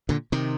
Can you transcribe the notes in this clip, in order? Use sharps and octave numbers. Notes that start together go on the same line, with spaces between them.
A#2 D3
C3 D#3